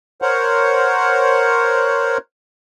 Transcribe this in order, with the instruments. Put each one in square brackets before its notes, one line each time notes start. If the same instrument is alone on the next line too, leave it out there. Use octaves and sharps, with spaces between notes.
[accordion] A#4 C5 C#5 F#5